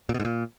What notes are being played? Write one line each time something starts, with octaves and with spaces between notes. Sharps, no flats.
A#2
B2
G#2
A#2